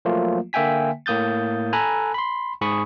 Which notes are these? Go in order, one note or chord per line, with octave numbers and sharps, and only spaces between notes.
F3 F#3 A3 A#3 F4
D3 A#3 E5 G5 G#5 B6
A2 A#3 D#6 G6 A6
A4 G#5 A#5 B5 F#6
B5 C6
G#2 G#4 B5 C#6 D#6